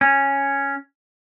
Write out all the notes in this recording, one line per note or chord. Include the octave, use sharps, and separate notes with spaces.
C#4